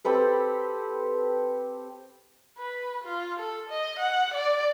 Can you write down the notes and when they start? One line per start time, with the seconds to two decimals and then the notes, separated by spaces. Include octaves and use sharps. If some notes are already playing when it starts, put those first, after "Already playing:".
0.05 C4 G4 A4 B4
2.58 B4
3.04 F4
3.39 A4
3.70 D#5
3.99 F#5
4.34 D5